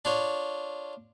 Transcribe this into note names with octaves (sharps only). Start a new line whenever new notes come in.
D4 F4 C#5